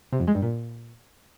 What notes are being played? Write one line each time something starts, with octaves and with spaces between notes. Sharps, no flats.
C3
F2
G#3
G2
A#2